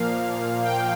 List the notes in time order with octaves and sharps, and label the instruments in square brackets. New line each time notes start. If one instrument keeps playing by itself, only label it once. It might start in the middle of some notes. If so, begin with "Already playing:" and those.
Already playing: [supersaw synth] A#2 F3 A#3 F5
G5